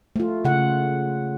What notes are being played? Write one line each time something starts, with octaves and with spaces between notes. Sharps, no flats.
A3 F4
C#3 F#5